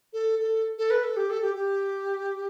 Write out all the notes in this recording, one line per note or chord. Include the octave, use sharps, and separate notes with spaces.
A4
A4
A4
B4
A4
G4
A4
G4
G4